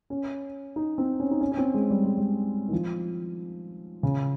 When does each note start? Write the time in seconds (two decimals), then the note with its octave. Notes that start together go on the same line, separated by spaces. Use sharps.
0.10 C#4
0.76 D#4
0.98 C4
1.20 C#4
1.31 D#4
1.41 C#4
1.52 C#4
1.57 C4
1.74 G#3
1.90 G3
2.05 G#3
2.18 G3
2.68 D#3
2.72 F3
4.03 C#3